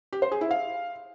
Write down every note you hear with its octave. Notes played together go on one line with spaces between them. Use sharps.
G4
C5
G#4
E4
F5